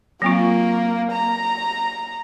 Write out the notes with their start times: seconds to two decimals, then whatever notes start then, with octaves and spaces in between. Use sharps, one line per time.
0.22 F#3 A#3 C4 F4
1.12 A#5